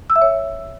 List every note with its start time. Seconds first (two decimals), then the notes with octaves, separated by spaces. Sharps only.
0.10 E6
0.16 E5
0.22 C#5